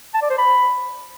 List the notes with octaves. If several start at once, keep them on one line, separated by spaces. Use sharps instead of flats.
A5
D5
C5
B5